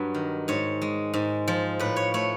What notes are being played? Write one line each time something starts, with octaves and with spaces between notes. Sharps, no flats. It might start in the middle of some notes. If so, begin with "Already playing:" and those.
Already playing: G2 F#3
D#3
G#2 C#5
G#3
G#2
F3
A2 B4
C#5
A3 C#5